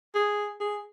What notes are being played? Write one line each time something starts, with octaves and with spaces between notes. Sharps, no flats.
G#4
G#4